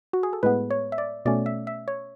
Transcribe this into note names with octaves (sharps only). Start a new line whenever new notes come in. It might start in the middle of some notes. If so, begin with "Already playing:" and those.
F#4
G#4
A4
A2 G#3 B3 B4
C#5
E5
D5
B2 A3 C#4 D5
E5
E5
C#5